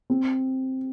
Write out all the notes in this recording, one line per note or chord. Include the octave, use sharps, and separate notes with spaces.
C4